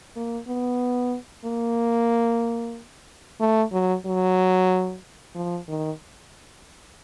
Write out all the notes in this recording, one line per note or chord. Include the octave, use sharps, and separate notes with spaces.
A#3
B3
A#3
A3
F#3
F#3
F3
D#3